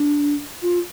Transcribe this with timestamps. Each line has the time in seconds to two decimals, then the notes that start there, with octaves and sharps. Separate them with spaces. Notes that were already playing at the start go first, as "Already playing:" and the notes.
Already playing: D4
0.62 F4